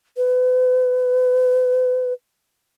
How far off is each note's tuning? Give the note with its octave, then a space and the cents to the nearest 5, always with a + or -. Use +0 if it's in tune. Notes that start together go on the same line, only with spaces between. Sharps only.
B4 +40